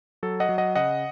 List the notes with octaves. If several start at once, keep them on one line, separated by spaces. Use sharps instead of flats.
F#3 A4
D#5 F#5
F#3
D#5 F#5
C#3 D#5 F#5